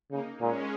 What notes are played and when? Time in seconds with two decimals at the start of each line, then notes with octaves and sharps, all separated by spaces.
0.11 C#3 A#3 D#4
0.40 A#2 G#3 C#4